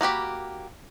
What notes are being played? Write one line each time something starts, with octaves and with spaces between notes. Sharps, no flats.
A#3 F#4 G4 B5